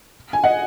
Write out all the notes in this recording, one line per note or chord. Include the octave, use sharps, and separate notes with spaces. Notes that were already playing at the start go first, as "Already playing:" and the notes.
G#5
D#5 F#5